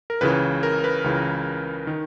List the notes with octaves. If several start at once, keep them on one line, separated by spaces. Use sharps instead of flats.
A#4
C#2 C#3 E3 B4
A#4
B4
C#2 C#3 E3
D#3